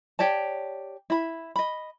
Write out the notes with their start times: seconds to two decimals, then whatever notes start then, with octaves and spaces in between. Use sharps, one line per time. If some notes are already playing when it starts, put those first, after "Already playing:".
0.19 G4 C#5 D5 A5
1.10 E4 B5
1.56 D#5 B5